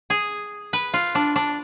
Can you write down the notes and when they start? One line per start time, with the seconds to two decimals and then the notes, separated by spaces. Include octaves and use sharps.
0.10 G#4
0.73 B4
0.94 F4
1.15 D4
1.36 D4